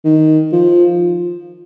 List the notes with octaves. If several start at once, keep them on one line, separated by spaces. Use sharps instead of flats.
D#3
F3